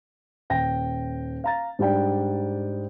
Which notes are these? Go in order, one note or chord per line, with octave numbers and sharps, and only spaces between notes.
D#1 G5 A#6
F5 A#5 A6
G#2 G3 D4 G5